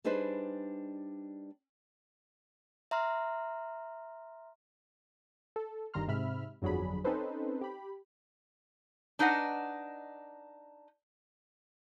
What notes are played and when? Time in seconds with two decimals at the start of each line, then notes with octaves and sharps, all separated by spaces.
0.04 G3 D4 D#4 G#4 B4 C5
2.91 E5 A#5 C6 F6
5.56 A4
5.94 G1 G2 D#3 A#5 C6 F6
6.08 G#2 C3 E5 B5 F6
6.62 G1 F2 F#3 D4 G#4 B5
7.04 C4 C#4 D#4 A4 B4 C5
7.61 G4 B5
9.19 D4 D#4 B4 D#5 F#5